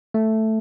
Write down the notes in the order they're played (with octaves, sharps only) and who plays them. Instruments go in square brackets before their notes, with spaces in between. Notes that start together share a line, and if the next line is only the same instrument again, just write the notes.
[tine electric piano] A3